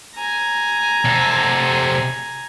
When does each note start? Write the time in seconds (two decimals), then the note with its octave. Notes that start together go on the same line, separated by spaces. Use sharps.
0.15 G#5 A#5
1.05 C3 A4